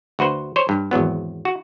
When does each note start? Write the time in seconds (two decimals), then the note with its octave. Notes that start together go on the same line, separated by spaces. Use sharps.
0.19 D2 F#4 B4 C5
0.56 C5 C#5
0.69 G2
0.91 G#1 E2 F#3 B3
1.45 F#4